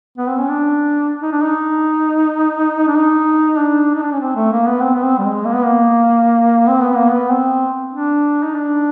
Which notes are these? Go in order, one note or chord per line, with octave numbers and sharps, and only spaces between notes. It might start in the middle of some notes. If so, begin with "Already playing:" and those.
B3
C4
C#4
D4
D#4
D4
D#4
D4
D#4
D4
D#4
D4
C#4
C4
A3
A#3
B3
C4
B3
C4
G3
G#3
A#3
B3
A#3
C4
B3
A#3
B3
C4
D4
D#4
D4